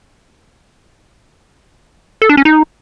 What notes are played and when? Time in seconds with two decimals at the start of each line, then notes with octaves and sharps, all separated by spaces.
2.22 A4
2.29 D4
2.37 C#4
2.45 D#4